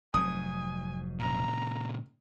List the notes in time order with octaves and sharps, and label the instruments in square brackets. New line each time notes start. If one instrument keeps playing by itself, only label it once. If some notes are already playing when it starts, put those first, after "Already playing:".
[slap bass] F1 G#2 F#3 [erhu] G#5 [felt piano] D#6
[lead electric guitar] A#2 C#3 [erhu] A#5